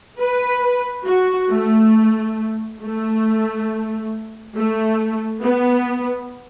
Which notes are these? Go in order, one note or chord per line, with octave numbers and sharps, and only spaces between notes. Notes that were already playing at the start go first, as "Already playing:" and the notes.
B4
F#4
A3
A3
A3
B3